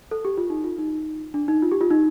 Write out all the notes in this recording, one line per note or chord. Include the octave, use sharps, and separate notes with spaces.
A4
G4
F4
D#4
F4
D#4
D4
D#4
F4
G4
F4
D#4